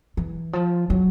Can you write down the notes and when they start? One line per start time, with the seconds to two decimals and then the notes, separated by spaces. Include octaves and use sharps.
0.17 E3
0.53 F3
0.90 F#3